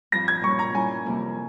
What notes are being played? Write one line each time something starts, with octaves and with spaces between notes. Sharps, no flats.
G2 F3 C4 A#6
G#6
A#2 G3 C#4 C#6
A#5
G3 C#4 E4 A#4 G#5
F2 C3 G3 A#3